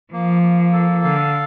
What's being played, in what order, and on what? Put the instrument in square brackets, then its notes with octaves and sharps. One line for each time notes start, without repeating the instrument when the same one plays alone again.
[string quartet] F3 [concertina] A#3
[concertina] A#3
A4
[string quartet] D3 [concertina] F5